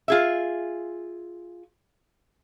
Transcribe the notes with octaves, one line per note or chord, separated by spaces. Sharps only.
F4 G#4 E5